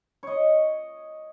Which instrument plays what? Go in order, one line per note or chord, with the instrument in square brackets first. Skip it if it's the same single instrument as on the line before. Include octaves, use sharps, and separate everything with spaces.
[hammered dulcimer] C#5 D#5